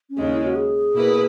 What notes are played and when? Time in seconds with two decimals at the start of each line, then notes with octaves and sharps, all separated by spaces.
0.10 C#4
0.17 D#2 C#3 G#3 D#4
0.32 E4
0.44 F#4
0.55 G#4
0.93 B2 A#3 E4 B4